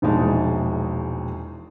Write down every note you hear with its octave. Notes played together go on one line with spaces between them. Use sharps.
E1 A#1 E3 G#3 D#4 A5